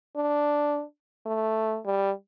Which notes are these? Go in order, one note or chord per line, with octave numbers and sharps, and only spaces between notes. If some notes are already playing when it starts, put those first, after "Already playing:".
D4
A3
G3